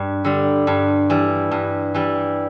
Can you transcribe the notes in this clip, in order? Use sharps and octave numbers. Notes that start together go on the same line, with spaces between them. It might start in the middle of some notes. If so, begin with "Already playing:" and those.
Already playing: G2 G3
D3 G3
G2
E3 G3
G2
E3 G3